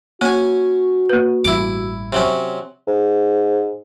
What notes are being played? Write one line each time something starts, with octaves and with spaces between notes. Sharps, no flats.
A#3 C#4 F#4 G#5
A#3 B4
A1 G2 E4 D6
C3 F#3 C#4
G#2